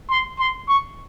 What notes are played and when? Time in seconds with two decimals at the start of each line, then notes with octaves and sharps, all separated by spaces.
0.10 C6
0.39 C6
0.68 C#6